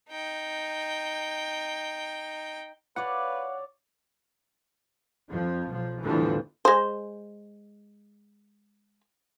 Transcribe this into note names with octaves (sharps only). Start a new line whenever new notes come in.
D#4 G5
B4 C#5 D5 F5 F#5
F2 F3
B1 F3
E2 A2 D3 E3 F3 G3
G#3 C5